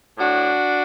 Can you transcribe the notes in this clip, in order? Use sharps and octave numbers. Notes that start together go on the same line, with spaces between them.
A2 D4 F#4